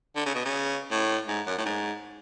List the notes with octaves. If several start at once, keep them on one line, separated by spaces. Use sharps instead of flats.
D3
C#3
B2
C#3
A2
G#2
F#2
A2
G#2